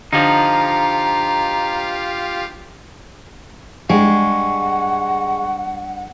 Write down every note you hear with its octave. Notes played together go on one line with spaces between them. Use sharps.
D3 F3 D#4 F4 G4 F5 A#5
G2 G#3 F#5 C#6